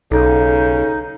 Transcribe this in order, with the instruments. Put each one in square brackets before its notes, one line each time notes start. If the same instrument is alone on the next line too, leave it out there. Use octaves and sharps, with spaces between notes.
[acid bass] B1 [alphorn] C#3 [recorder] D#4 [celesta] A4